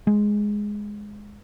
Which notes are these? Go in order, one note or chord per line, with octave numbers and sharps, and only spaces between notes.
G#3